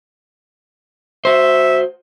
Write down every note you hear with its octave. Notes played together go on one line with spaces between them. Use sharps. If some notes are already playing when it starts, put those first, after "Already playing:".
F#4 C5 E5